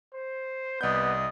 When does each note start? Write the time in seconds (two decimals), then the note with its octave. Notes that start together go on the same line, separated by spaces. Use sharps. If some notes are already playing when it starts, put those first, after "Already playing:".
0.13 C5
0.81 C2 B3 D5 D#5 D#6 G6